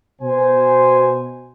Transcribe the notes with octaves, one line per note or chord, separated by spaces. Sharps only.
B2 C5 G#5